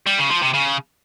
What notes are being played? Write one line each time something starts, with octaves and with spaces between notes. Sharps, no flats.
G3
C#3
F3
C3
C#3